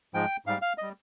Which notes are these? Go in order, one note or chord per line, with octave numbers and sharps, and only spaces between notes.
G#2 F3 G#3 G5
G#2 G3 F5
F5
G3 D#5